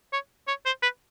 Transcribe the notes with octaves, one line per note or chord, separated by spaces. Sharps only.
C#5
C#5
C5
B4